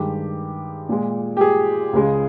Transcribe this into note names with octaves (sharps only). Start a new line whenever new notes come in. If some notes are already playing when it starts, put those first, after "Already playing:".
Already playing: G2 D#3 G#3 G4
A#2 G#3
G4
G#4
C#2 C#3 G#3